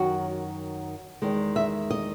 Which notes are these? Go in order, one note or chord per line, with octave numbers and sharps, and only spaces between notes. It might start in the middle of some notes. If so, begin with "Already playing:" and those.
Already playing: F#2 D#3 F#3 F#4
E2 D#3 G#3
E5
D#5